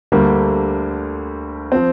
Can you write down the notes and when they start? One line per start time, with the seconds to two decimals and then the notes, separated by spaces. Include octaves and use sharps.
0.12 D2 D3 G3 A#3
1.72 F3 C4